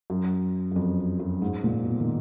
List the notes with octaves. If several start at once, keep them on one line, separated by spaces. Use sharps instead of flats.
F#2
F#2
F2
F#2
G#2
A#2
B2
D#3